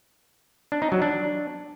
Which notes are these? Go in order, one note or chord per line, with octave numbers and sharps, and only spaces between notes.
D4
D#4
F#3
D4